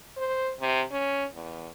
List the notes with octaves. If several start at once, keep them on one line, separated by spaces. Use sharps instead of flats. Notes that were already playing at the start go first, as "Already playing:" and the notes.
C5
C3
C#4
E2